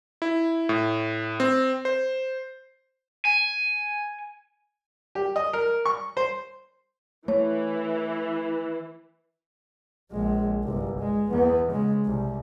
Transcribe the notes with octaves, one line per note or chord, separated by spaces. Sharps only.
E4
A2
C4
C5
G#5
G4
D#5
A#4
C#6
C5
E3 A3 C#5
A#1 G#3
G1 C2
G#3
E2 B3
C#3 G#3
C2